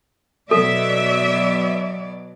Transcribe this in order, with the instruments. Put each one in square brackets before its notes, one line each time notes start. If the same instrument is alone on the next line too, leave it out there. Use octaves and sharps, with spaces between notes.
[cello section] B2 F#3 B3 [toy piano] A4 [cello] D5 [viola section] E5